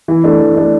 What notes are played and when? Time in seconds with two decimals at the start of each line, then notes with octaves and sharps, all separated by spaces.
0.08 E3
0.24 A3 D4
0.40 E3
0.56 A3 D4